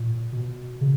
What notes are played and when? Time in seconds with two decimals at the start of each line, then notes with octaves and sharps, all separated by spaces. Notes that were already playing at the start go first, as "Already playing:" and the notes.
Already playing: A#2
0.32 B2
0.81 C#3